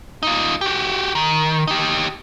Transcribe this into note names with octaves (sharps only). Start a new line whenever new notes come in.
D#4 F4
F#4 G4
D#3
D#4 G4